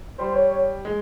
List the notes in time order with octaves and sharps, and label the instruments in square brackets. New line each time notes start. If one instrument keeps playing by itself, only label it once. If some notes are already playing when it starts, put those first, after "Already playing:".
[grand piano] G3 [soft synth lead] C5
[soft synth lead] C5
C#5
[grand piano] G#3